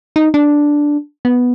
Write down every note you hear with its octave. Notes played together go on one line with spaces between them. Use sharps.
D#4
D4
B3